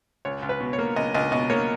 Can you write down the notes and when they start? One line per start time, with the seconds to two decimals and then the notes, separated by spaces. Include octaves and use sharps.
0.25 C#2 C#5
0.42 C#2
0.49 B4
0.60 B2
0.73 C#5
0.78 A#3
0.96 C#2 D#5
1.14 C#2 D#5
1.32 B2 D#5
1.50 A#3 C#5